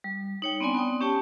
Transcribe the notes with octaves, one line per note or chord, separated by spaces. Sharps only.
G3
D#4 C#5 G5
B3 C4 D4 D5 G#5 C6
B3 G5 D#6
C#4 G4 C#5 G5 A5 C#6